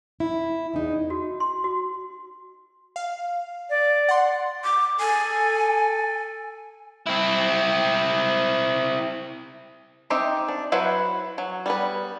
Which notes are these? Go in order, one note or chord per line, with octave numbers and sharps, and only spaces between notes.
E4
E2 D#4
F#4
C6
F#4
F5
D5
F#5 C6
D6
A4 G#5
C4 E4
C4 D#4 G4 E5
D4
F#3 E4 B4 C5 F#5
F#3
G3 B3 B4